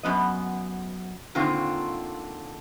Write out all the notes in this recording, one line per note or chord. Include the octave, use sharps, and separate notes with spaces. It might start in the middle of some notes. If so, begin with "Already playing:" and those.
F#2 B3 D#5
A#2 D3 D#3 C4 F4